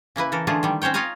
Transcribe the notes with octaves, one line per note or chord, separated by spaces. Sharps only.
C#3 A#3 E4 B4
E3 A4 A#4
D3 E3 A3 F4 G#4
D#3 G3
C4 C#4 C5 C#5 G5
F4 C#5 D#5 F5 G#5 A#5